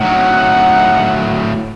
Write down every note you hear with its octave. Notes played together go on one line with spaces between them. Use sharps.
A2 F#3 D#4 F#5